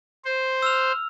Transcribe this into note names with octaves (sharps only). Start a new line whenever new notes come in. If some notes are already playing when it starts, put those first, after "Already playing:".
C5
E6 F6 F7